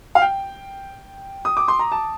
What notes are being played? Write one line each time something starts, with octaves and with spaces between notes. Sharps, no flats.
F5
G5
D#6
D6
C6
A#5
A5